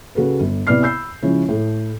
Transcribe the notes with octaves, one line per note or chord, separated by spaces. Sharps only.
C#3 F#4 A4 B4
G1
C3 B3 E4 D5 F6 C7
B5 E6 G6 C7
C#3 F3 G#3 C#4 E4
A2 A4